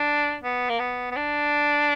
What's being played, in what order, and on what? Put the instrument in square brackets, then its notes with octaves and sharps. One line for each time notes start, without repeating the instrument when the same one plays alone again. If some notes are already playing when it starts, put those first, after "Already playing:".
Already playing: [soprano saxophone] D4
B3
A#3
B3
B3
D4